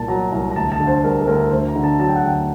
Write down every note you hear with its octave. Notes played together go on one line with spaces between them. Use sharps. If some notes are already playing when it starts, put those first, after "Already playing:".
Already playing: C2 A#2 A5
F#3 A#5
C2 A#5
A#5
D2 A5
A5
D3
C5
G3 A#4
A4
D2 A#4
D2 C5
A#5
D3
A5
F#3 A5
G5
F#5
D2 G5